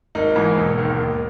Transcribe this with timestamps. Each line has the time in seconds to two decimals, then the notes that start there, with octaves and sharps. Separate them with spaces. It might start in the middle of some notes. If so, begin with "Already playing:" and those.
0.15 G#1 D#4
0.36 G#2 E3
0.57 E1
0.78 D#2 D#3
0.99 D#2